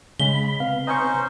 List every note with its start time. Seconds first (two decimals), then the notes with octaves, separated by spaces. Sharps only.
0.20 C#3 G#3 B5 G7
0.60 C3 B3 F5
0.87 C#4 D#4 C5 D#5 G#5 C#6